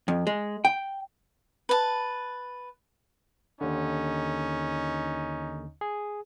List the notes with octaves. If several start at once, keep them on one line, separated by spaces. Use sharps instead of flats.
F2
G#3
G5
B4 A5
D#2 D3 C#4 D#4
G#4